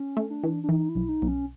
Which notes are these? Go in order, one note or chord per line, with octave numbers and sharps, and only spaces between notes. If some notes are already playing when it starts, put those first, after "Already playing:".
Already playing: C#4
A3
D4
E3
D4
E3 D#4
E4
B1
D#4
B1
C#4